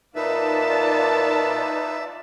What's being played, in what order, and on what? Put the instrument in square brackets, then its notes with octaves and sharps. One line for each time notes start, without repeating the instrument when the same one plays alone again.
[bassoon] A#2 [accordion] D#4 B4 [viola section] F4 D5 A5 [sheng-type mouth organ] E5